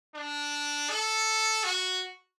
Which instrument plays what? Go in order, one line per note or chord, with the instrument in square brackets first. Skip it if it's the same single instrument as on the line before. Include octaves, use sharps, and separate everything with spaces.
[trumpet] D4
A4
F#4